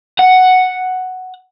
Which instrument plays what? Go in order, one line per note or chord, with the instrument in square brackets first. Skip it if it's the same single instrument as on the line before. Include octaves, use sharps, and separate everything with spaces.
[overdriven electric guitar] F#5